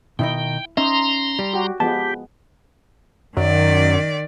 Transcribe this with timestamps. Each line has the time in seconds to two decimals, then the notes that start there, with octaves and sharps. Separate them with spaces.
0.19 B2 D#3 D#4 E4 G5
0.77 C#4 D#4 E5 A#5 C6
1.39 G3
1.53 F#4 G4
1.80 F3 G#3 B3 G4 A5
3.37 F#2 D#3 D5